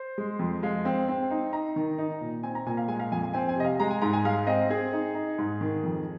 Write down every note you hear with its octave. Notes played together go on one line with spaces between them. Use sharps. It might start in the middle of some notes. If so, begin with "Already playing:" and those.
Already playing: C5
G#3
F2
G#3 F5
C4
C4
D#4
D#4 A#5
D#3
D#4
A#2
C4 G#5
A#5
A#2 G#5
F5
G#3 G#5
F5
F2 G#5
G#5
C4 G#5
G#5
C3 D#5
F5
G#3 A#5
G#5
G#2 A#5
G#5
G#3 F5
C4 D#5
C4 G#4
D#4
D#4
G#2
D#3
F2